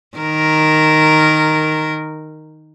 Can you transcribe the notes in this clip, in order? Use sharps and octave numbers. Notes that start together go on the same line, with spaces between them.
D#3 A#4